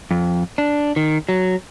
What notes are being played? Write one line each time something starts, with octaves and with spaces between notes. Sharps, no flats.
F2
D4
D#3
F#3